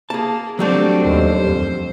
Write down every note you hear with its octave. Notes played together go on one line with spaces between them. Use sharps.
A#3 G#4 A5
F#3 G3 A3 C4 D4 F#4
D#2 C5
F2